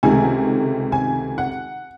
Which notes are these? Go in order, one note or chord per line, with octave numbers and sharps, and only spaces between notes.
C#2 C3 D#3 A3 G#5
G#5
F#5